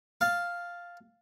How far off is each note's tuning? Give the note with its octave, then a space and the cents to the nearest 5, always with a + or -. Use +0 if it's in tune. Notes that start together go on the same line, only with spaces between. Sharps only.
F5 +0 A5 +0